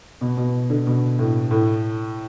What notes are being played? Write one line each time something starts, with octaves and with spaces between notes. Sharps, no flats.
B2
B2
D3
B2
A2
A2